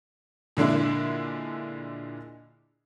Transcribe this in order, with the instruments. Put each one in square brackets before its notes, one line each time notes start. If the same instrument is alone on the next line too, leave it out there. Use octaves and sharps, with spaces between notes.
[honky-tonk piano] A#2 D3 G#3 D4 E4